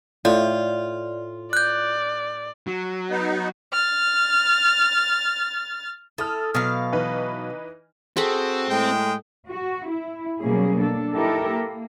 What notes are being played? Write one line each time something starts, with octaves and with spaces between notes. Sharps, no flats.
A2 F4 D5
D5 F#6 G6
F#3
B3 D#4
F6 A6
E4 A4 D#6 F6
B2 F#3 F5
E3 D#4 B4
C4 F#4 G#4 A4 B5
A2 G#3 G5
F#4
E4
B2 F#3 G3 A#3 C#4 G#4
D4 A4
D#4 E4 G4 A4 A#4
A#3